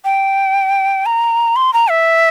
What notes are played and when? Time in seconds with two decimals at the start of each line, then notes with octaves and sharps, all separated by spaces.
0.05 G5
1.06 A#5
1.56 C6
1.73 A#5
1.90 E5